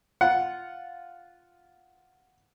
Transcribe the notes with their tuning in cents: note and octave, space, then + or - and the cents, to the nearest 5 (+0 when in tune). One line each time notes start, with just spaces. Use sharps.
F4 +0 F#5 +0